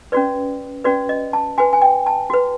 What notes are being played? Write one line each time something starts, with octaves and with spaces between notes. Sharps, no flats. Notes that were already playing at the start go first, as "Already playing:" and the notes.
C#4 F#4 B4 D5
C#4 F#4 B4 D5
D#5
A5
F#4 B4 G#5
G#5
G5
A5
F#4 B4